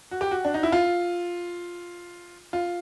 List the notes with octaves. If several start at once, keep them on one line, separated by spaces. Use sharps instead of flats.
F#4
G4
F#4
D4
D#4
E4
F4
F4